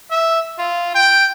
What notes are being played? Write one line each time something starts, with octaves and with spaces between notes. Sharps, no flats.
E5
F4
G5